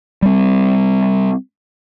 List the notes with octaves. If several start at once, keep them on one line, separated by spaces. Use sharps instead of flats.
G3 C4